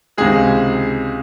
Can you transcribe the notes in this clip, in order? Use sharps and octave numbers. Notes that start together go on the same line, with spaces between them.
C#2 C3 D#3 G#3 G#4